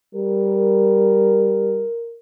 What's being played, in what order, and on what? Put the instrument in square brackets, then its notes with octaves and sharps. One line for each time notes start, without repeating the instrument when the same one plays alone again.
[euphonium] G3 [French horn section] A#4